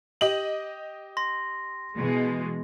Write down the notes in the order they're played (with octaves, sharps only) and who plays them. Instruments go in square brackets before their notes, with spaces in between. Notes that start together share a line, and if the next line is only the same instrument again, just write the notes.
[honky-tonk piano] G4 D#5 F#7
[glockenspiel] C6 A#6
[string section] B2 E3 G#3